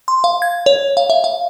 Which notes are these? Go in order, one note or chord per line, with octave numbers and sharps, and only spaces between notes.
C6
F5
G#6
C#5
F5
E5
F5